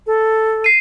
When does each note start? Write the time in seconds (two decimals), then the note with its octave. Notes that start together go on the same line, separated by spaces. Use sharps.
0.07 A4
0.64 C7 D#7